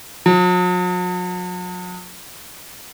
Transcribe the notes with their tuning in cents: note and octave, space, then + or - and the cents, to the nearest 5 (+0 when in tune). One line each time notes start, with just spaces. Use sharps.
F#3 -45